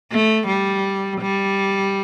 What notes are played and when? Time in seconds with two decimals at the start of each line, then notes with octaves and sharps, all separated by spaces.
0.12 A3
0.48 G3
1.21 G3